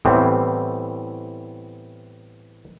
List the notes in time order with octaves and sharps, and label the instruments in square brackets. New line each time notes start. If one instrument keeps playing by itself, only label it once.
[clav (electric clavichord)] A2 E3 G3 A3 B3 C4